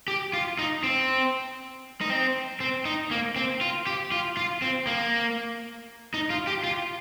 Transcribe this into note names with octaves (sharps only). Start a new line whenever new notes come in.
G4
F4
D#4
C4
D#4
C4
C4
D#4
A#3
C4
F4
G4
F4
F4
C4
A#3
D#4
F4
G4
F4